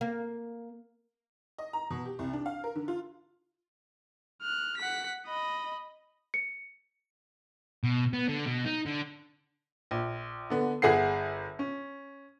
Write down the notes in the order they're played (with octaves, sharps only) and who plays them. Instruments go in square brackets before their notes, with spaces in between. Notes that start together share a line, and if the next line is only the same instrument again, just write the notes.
[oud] A#3
[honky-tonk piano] D#5
A#5
B2
G4
C2
D4
F5
A#4
D3
F4
[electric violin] F6 F#6
F#5 B6
D#5 B5
[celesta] C#7
[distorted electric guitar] B2
B3
D3
B2
D#4
D3
[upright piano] A#1
D3 B3
G1 G#4 E5 F#5 C7
C#4